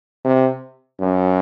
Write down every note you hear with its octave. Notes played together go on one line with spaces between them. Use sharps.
C3
F#2